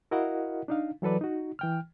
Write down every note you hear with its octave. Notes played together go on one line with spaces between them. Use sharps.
E4 F#4 A#4 D#5 F5 F#5
D4 D#4 F5
E3 F#3 A4 B4 D5
D#4 F#4
E3 G5 F6